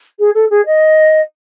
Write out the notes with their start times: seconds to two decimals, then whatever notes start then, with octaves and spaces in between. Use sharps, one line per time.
0.19 G#4
0.34 A4
0.50 G#4
0.65 D#5